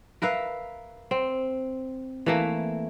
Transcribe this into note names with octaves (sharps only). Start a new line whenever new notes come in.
A#4 B4 E5 F5
C4
E3 A3 A#3